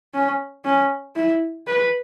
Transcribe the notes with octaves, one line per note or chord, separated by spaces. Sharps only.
C#4
C#4
E4
B4